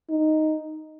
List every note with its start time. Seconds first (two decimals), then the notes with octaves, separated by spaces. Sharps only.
0.10 D#4